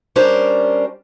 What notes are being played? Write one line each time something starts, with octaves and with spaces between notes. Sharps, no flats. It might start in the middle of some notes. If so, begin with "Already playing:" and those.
G3 C#4 D4 A#4 C5